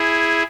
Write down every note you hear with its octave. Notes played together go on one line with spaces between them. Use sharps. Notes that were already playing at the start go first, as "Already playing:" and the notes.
Already playing: E4 G#4